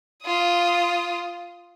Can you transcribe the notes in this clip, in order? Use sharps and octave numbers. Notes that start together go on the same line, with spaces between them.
F4 D#6